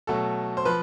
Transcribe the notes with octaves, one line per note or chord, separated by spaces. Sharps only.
B2 F#3 A3 A4
C5
F3 B4